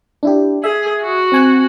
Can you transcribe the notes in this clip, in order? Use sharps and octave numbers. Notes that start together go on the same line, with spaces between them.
D4 E4 G4
G#4 E5
F#4
C4 G#5 F#6